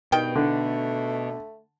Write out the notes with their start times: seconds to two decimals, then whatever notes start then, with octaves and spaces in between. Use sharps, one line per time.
0.12 G2 B2 D#3 G5
0.36 D3 A3